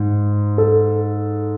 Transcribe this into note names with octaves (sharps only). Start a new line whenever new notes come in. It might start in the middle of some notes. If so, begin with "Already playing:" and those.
Already playing: G#2
A4